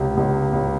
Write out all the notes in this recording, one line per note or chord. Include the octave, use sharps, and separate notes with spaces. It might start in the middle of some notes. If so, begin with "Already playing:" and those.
Already playing: C#2 C3
C#2
C#2